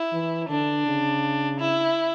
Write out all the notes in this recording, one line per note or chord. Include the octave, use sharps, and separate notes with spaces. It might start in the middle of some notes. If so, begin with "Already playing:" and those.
Already playing: E4
E3
D3 D4
C#3
E4